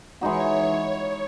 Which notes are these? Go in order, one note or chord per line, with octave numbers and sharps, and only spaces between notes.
E3 G#3 D#4 F#4 C#5